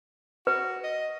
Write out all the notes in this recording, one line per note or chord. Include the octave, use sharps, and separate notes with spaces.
F#4 B4
D#5